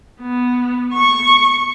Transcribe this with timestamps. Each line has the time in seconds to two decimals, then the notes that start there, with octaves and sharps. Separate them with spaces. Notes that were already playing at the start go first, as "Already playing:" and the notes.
0.21 B3
0.93 C#6